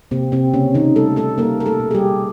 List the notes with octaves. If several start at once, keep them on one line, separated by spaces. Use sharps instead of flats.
C3 A#3 C4
C3 C4
C#3 A#3 C#4
D#3 D#4
G3 A3 A4
A3 A4
G3 A#3 A#4
A#4
A3 A4
B2
G#4
G3 G4